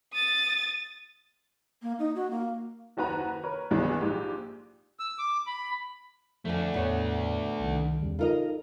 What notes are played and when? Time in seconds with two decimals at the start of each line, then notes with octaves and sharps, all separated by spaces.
0.13 D#6 A6
1.82 A#3
1.99 D#4
2.15 F#4
2.31 A#3
2.97 F#1 D#2 F#4 B4 A#5
3.44 A#4 B4 C#5
3.71 C2 G2 E3 F#3 G#3 B3
4.01 A#1 G#2 G#3 G4
5.00 E6
5.19 D6
5.47 B5
6.45 F2 F3 A3 D4 G#5
6.74 E2 A2 B3 C#5
7.60 C2 D#3
8.02 E2 C#3 G3
8.19 D#4 F4 A4 A#4 D#5